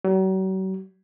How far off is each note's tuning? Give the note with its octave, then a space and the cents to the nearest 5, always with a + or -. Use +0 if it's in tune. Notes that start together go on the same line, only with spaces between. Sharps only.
F#3 +40